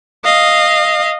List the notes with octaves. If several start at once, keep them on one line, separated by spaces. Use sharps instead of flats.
D#5 F5